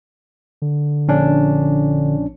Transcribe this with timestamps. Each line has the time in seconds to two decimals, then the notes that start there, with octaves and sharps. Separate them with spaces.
0.62 D3
1.08 A#1 C#4 D4